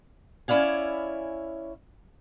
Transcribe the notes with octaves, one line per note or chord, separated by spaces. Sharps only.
C#4 E4 D5 F5 G#5